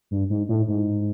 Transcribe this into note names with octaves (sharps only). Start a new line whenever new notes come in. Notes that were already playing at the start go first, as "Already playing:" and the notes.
G2
G#2
A2
G#2